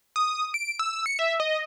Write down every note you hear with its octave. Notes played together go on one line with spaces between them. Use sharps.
D#6
D7
E6
C#7
E5
D#5